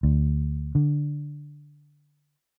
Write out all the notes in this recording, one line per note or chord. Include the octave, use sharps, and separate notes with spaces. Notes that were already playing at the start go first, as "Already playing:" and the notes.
D2
D3